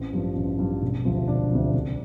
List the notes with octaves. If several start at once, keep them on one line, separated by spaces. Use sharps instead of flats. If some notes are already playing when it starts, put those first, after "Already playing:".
Already playing: A1 C4
G2 F3
A1
G2 F3
E1
D2 C3 F3
E1 D4
D2 C3 F3
C2